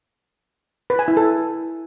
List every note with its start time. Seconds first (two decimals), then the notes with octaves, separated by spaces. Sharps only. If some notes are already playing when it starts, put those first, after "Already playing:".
0.90 B4
0.99 G#5
1.08 E4
1.17 A4